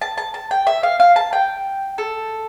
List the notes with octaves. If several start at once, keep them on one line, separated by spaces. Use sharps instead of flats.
A5
A5
A5
G5
E5
F5
F5
A5
G5
A4